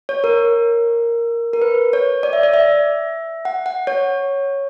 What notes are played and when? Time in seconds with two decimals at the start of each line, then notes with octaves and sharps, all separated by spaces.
0.09 C#5
0.24 A#4
1.53 A#4
1.62 B4
1.93 C#5
2.23 D5
2.33 E5
2.43 D5
2.54 E5
3.45 F#5
3.66 F#5
3.87 C#5